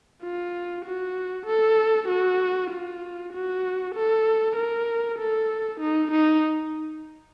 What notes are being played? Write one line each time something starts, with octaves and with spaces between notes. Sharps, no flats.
F4
F#4
A4
F#4
F4
F#4
A4
A#4
A4
D#4
D#4